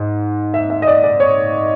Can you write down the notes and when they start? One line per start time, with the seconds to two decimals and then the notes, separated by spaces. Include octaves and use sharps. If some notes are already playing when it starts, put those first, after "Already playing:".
Already playing: G#2
0.54 E5
0.70 E5
0.82 D#5
0.87 D5
1.04 D5
1.20 C#5